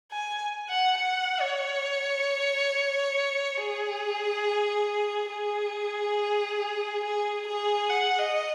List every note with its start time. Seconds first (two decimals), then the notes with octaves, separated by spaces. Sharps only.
0.12 G#5
0.69 F#5
0.98 F#5
1.41 C#5
3.58 G#4
5.31 G#4
7.04 G#4
7.48 G#4
7.90 F#5
8.19 D#5